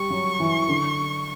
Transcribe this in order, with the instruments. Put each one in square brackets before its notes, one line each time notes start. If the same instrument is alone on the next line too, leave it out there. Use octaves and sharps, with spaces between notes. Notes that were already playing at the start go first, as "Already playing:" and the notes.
Already playing: [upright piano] G3 [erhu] C#6
[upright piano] F#3
E3
D3